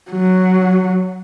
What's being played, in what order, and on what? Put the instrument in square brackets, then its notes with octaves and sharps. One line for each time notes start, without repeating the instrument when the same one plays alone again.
[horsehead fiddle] F#3